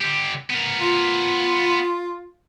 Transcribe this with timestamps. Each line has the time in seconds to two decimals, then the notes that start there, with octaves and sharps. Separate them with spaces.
0.01 D3 G4
0.50 B3 A#4
0.79 F4